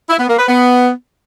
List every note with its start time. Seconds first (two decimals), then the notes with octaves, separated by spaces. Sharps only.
0.10 E4
0.19 B3
0.29 A#3
0.39 B4
0.49 B3